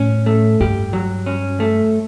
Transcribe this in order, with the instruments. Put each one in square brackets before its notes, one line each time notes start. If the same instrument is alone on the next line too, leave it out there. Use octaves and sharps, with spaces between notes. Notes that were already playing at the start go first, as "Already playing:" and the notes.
Already playing: [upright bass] A2 [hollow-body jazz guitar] C#4
[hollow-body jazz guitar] A3
[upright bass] G2 [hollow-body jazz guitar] G4
[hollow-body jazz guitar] F#3
C#4
A3